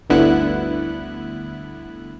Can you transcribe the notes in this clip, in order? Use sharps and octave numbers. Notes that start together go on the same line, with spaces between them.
G1 D2 D3 B3 E4 F#6